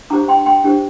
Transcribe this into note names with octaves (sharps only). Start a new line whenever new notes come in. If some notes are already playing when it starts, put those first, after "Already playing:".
D4 G4 C5 A#5 D6
G5 C6
G5 C6
D4 G4 C5